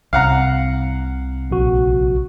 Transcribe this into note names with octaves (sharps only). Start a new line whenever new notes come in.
C2 C3 F5 F#5 A#5
A#1 F#4